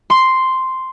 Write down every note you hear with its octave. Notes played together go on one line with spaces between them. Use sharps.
C6